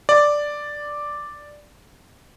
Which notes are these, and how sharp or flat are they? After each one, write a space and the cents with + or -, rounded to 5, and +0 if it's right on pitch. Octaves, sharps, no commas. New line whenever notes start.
D5 +0